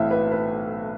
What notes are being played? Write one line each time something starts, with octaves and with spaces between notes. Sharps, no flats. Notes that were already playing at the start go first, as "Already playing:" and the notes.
Already playing: B1 A2 E3 A3 C4 E5
B4
B4